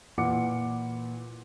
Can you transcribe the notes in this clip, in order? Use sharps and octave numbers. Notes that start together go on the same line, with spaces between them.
A#2 E3 B4 F#5 D6 C#7